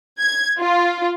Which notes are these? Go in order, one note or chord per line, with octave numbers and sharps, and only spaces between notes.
G#6
F4